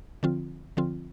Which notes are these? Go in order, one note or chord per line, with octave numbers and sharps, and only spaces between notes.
D3 F3 C4 F4
D3 F3 C4 F4